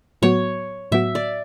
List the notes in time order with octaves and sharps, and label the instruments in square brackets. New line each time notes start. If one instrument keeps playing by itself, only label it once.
[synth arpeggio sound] A2 F#3 B3 F#4 [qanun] C#5
[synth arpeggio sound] A2 F#3 B3 F#4 [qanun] E5
[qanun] D5